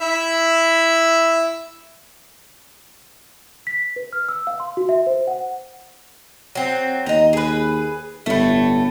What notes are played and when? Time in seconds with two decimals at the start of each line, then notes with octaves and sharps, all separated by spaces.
0.02 E4 E5 B5
3.67 B6
3.96 B4
4.13 F6
4.29 E6
4.47 F5
4.60 C6
4.77 F#4
4.89 E5
5.07 C5
5.27 F#5
6.55 F#3 C4
7.06 D#2 D#5 A#5
7.33 G#4 B4
8.26 G1 A2 A3